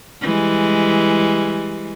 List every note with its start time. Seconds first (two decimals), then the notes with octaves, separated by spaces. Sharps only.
0.21 E3 G3 G#3